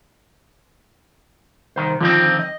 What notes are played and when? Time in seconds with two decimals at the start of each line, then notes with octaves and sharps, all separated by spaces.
1.76 C2 D#3 C5
2.01 D3 D#3 F3 C4
2.39 D#5